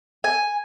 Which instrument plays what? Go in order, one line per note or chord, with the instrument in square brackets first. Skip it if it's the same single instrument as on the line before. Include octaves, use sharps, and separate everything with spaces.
[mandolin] G#5